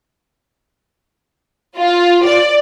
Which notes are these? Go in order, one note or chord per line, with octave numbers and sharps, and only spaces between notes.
F4
D5